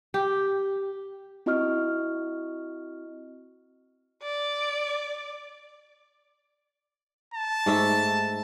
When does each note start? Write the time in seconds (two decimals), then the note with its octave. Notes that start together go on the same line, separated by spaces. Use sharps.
0.14 G4
1.46 C4 E4 F#4 D#5 C#6 F6
4.23 D5
7.34 A5
7.66 G#2 A3 E5